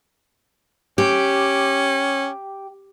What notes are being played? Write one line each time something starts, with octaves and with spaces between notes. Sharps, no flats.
C#4 G4